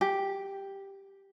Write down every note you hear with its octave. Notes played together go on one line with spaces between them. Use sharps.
G4